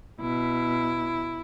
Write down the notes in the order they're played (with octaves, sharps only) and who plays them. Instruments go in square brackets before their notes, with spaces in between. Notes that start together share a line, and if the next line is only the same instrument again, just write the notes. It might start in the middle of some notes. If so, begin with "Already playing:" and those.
[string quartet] B2 E4